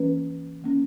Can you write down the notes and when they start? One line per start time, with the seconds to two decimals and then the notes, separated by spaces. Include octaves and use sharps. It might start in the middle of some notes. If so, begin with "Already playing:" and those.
Already playing: E3 A#3 C#4 B4
0.62 D#3 A#3 C#4